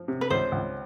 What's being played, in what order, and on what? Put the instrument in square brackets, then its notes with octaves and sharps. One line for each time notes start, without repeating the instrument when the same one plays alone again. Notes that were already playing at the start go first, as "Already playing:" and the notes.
Already playing: [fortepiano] F3
C3
[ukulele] B4
[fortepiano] C#2 [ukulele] C5
[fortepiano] C#2